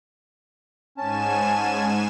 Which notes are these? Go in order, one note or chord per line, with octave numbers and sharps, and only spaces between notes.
G#2 C#4 G#5 A5 E7